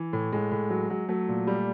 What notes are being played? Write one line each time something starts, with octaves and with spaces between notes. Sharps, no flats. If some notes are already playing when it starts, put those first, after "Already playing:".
Already playing: E3
A2
A2 G#3
A2
F#3
F#3
F#3 A3
A#2
G3